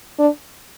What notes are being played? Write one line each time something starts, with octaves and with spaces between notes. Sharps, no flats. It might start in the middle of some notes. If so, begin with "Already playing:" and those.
D4